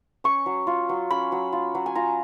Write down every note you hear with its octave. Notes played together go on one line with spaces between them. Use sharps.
C#4 C#6
F#3
F4
F#3
C#4 B5
F#3
F4
F#3
G#5
F4 A#5